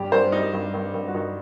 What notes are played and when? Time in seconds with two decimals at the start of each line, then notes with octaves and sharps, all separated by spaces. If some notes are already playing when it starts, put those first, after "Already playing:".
Already playing: G2 G4
0.12 G2 C5
0.32 G3 D#4
0.53 G2
0.74 G2
0.94 G2
1.08 F#4
1.14 G2 D#4